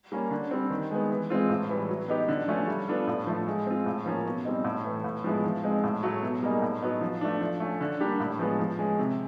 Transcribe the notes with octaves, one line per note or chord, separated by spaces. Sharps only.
G3 A#3 C#4
D3
G3 C4
D#3
G#3 B3
E3
G#3 C4 F4
A2
E3 G3
F#3
B3 D#4 G4
D3
F3 A3 C#4
G3
B3 D4 F4 A4
A2
F3 A3
G#3
C4 F4
A2
F3 A#3 C#4
B2
G3 C4 D#4
A2
E3 A3
A2
F3 G#3 B3 E4
F3
G#3 C4 D#4
A2
F#3 A3
B2
G3 A#3 D#4 G#4
A2
F#3 B3 D#4
F3
A3 D4
F3
A3 C#4
D3
G3 A#3 D4 G4
A2
F3 G#3 B3
F3
G#3 C#4
C3